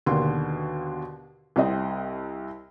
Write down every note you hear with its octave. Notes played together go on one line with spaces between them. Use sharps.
D#2 B2 D3 C6
C2 C4 D#5